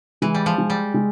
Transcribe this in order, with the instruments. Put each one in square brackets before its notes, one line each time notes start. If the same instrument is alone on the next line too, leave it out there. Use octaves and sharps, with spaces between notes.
[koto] E3 [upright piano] G#3
[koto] G3
F3
[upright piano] G#3
[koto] G3
[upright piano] G#3